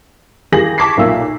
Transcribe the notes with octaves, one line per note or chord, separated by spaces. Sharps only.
E3 A#3 G4 G#4 A#6 F#7
A5 C#6 D6 G#6 B6 C7
B1 A#2 A#3 E5 E6